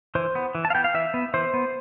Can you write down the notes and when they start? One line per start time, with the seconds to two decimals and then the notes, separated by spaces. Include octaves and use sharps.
0.15 E3 C5
0.35 B3
0.55 E3
0.65 A5
0.70 F5
0.74 B3 G5
0.84 F5
0.94 E3 E5
1.14 B3
1.34 E3 C5
1.54 B3